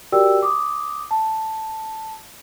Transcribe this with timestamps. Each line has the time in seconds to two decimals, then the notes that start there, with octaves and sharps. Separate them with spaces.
0.12 F#4 G4 A#4 D5 G5 E6
0.43 D6 D#6
1.11 A5